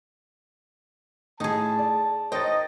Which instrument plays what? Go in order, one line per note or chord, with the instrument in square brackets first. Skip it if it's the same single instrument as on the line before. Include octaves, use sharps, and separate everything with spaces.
[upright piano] A2 [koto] D#4 G#4 [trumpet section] A5
[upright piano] D5
[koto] D#4 G5 [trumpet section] A#4 D#5 [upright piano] C5 C#5 A6